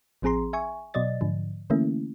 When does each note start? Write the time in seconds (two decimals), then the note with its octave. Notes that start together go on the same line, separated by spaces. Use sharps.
0.22 A1 F3 C4 G#4 A#5 C6
0.53 E5 G#5 C#6
0.94 B2 F#3 D5 D#5 A6
1.21 G#2 D3 F3
1.70 D3 E3 A3 A#3 C#4 E4